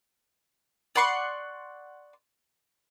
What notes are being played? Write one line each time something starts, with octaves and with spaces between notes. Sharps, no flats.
D5 F#5 C6 C#6